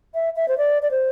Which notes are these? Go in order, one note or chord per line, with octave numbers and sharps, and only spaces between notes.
E5
E5
C5
D5
D5
C5